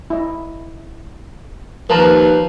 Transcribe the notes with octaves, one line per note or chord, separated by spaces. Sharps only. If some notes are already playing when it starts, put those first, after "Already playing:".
E4 D#5
D#2 F3 A#4 B4 A5 A#5